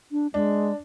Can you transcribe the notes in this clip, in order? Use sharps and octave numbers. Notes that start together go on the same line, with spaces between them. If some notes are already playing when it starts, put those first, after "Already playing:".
D4
G#3 D4